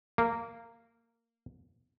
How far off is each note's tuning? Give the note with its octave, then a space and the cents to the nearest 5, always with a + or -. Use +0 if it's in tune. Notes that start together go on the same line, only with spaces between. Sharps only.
A#3 -15